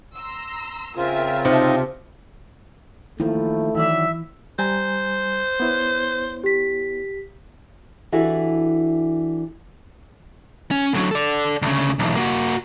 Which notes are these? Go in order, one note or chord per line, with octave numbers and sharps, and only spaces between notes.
A#5 C6 E6
C#3 C4 F4 A#4 E5 G#5
C3 D#4 E5 G5 A5
D#3 F3 A3 A#3 E4
D#3 E3 F#3 D5 E5
G3 C5 G#5 A#5
B3 E4 C#5
G4 B6
E3 D4 E4 F#4 G4 A4
C#4
D3 F#3
A4 D5
D2 C#3
B1 E2
A#3 F#4